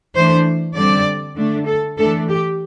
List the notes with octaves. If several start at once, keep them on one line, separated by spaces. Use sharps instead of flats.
E3 A3 D4 C5
D3 G3 C4 D5
D3 A3 D4
A4
E3 A3 D4 A4
G4